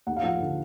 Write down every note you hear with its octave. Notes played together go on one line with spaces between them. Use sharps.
D#2 F#5
F5
F3 F#5
D3